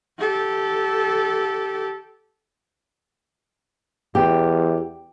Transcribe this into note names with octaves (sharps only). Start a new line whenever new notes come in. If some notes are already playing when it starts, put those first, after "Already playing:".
G4 A4
E2 G4